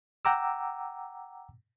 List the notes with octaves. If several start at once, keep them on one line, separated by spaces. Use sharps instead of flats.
F#5 G5 A#5 D6 E6